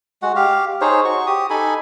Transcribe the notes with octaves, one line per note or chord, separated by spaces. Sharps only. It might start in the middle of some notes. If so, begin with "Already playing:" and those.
G#3 F#4 F#5
G4 F5
D#4 G#4 C5 C#5
F#4 C#6
G4 D#6
D#4 A4 G#5 B5